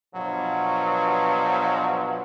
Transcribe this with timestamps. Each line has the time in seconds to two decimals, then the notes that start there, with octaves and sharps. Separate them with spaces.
0.14 G2 B2 F3 F#3